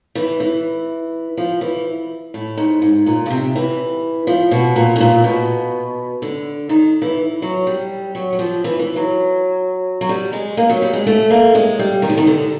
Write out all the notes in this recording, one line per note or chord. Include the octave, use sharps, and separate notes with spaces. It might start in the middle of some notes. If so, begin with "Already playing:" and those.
E3
E3
F3
E3
A2
G#2
G#2
A#2
C#3
C3
E3
F3
B2
A#2
A2
A#2
B2
D3
D#3
E3
F#3
G3
F#3
F#3
F3
E3
E3
F#3
F#3
G3
G#3
A#3
F#3
G3
G#3
A3
A#3
G#3
G3
D#3
D3
D#3
D3